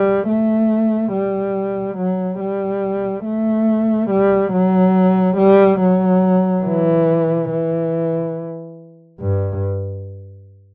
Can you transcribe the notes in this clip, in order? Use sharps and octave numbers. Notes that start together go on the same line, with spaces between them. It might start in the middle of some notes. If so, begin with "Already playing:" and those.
Already playing: G3
A3
G3
F#3
G3
A3
G3
F#3
G3
F#3
E3
E3
G2